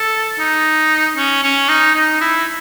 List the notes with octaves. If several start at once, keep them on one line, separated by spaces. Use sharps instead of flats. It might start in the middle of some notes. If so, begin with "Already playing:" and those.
Already playing: A4
D#4
C#4
C#4
D#4
D#4
E4